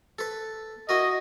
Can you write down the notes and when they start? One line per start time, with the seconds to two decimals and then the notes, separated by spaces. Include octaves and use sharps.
0.19 A4 B4
0.89 E4 F#4 A#4 D#5